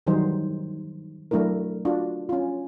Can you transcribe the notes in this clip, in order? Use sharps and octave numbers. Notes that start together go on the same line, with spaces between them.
D#3 E3 F#3 G3 D#4 C5
F#3 A3 D4 E4 A#4
D4 F4 F#4
C#4 F4